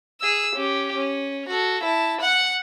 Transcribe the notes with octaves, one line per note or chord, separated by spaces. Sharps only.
G#4 E6
C#4 G4
C#4
F#4 A4
E4 A5
F#5 F#6